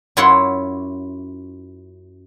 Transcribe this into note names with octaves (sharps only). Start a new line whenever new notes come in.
F#2 E4 F4 C#5 F#5 C6